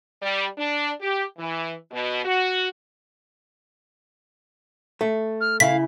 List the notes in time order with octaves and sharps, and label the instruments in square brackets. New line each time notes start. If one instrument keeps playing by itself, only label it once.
[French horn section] G3
D4
G4
E3
B2
F#4
[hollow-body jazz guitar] A3
[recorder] F6
[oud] C#3 E4 [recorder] F5 [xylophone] B6